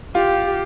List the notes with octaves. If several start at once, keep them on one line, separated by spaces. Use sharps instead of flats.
F4 G4